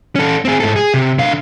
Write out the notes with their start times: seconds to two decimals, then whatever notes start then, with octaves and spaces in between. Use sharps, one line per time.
0.16 C#4 A4
0.45 C4 G#4
0.60 G#2 A4
0.76 G#4
0.94 C3
1.19 D3 F5